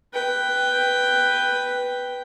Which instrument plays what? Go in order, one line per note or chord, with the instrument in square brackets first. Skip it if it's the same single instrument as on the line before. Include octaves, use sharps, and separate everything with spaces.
[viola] B4 G5